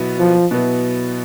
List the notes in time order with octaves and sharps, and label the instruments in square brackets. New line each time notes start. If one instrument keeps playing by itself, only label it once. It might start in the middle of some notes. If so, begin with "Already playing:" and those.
Already playing: [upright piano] B2 F#3 B3 E4
[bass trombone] F3
[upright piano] B2 F#3 B3 E4